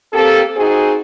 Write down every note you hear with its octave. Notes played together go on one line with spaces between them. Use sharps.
A#3 C4 G4 A4
C4 D#4 F#4 G#4